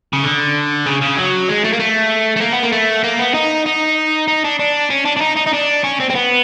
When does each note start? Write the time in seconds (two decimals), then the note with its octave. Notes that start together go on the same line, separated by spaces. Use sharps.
0.13 C#3
0.24 D3
0.86 C#3
1.01 C#3
1.17 F#3
1.48 G#3
1.64 A3
1.73 A#3
1.80 A3
2.37 A3
2.41 A#3
2.53 B3
2.63 A#3
2.72 A3
3.04 A#3
3.19 B3
3.34 D#4
3.66 D#4
4.28 D#4
4.44 D4
4.60 D4
4.90 C#4
5.06 D4
5.17 D4
5.21 D#4
5.37 D#4
5.47 D#4
5.53 D4
5.84 C#4
6.00 C4
6.10 C4
6.15 B3